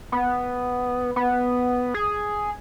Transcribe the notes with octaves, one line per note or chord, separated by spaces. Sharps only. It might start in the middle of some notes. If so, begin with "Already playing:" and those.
B3
B3
G#4